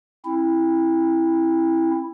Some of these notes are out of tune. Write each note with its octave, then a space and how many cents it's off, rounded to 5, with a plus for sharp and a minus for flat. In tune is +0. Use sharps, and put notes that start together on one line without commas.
C4 +30 E4 +0